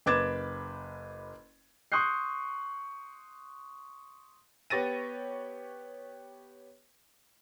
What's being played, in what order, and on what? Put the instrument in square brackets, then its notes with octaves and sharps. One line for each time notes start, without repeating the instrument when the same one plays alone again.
[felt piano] F#1 B4 D6 G#6 A6 E7
[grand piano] C6 C#6 D#6 F#6 G6 C7
B3 G4 C#5 A6 A#6 D#7